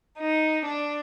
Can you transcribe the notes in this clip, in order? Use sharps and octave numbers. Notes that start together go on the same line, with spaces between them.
D#4
D4